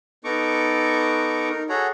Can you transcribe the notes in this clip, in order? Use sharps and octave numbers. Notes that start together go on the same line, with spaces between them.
B3 D#4 A4 A#5 C#6 D6
D#4 A#4
F#4 G#4 A4 C#5 F#5 A#5